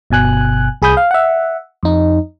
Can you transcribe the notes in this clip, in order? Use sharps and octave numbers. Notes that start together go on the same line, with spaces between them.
G1 B2 G#5 F#6
C2 G#4 B5 D#6 G6
F5
E5 F#5
F2 D#4